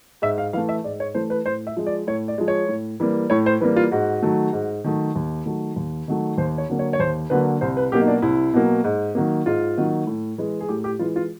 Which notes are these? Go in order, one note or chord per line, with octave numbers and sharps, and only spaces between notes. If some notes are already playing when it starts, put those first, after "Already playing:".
G#2 E5
F5
E3 A3 F5
E5
G#2 D5
C#5
E3 A3 C5
B4
A2 C5
E5
F3 G#3
D5
A2 C#5
D5
F3 G#3
C#5
A2
E3 G3 A#3
A2 C#5
C5
E3 G3 A#3 B4
F4
G#2 F#4
D#3 F#3 A3
G#2
D#3 F#3 A3
D#2
D#3 F#3 A3
D#2
D#3 F#3 A3
D#2 C5
C#5
D3 F#3 A#3
C#5
C#5
D#2 C5
D3 F#3 A#3 B4
C2 C5
B4
B2 F#3 A#3 G4
D#4
D4
C2 E4
B2 F#3 A#3
G#2
D#3 F#3 A#3
G#2 F4
D#3 F#3 A#3
A2
E3 G#3
G#4
A2 G4
G4
E3 G#3 F4
F4